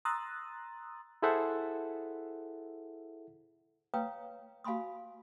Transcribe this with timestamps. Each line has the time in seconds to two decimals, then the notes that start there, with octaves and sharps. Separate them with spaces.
0.05 A#5 C6 D#6 E6 F#6 A6
1.22 E4 G#4 A4 C5 E5 F#5
3.94 B4 C#5 F5 G5 A#5 D#6
4.64 F#4 F5 G#5 B5 C6 D#6